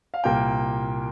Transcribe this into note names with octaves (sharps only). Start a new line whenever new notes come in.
F5
C2 A#2 A#3 G5